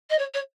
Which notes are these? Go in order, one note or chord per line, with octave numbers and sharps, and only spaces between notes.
D#5
C#5
C#5